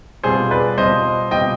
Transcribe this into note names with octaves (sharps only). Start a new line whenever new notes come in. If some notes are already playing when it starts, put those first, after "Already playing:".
B2 G3 C4 F4 G#4 C5
B4 D5
B2 G3 C4 F4 C5 D#5
B2 G3 C4 F4 D#5 G5